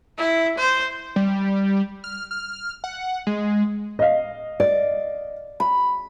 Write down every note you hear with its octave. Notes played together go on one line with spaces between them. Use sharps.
E4
C5
G3
F6
F6
F#5
G#3
D#5 F5
D5
B5